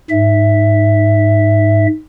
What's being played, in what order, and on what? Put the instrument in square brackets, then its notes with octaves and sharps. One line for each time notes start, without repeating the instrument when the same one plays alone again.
[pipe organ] G#2 E5